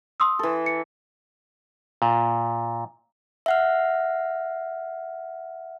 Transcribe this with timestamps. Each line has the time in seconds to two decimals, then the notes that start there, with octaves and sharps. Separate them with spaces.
0.20 C6 D#6 E6
0.39 E3 A4
0.66 C#7
2.02 A#2
3.46 E5 F#5 F6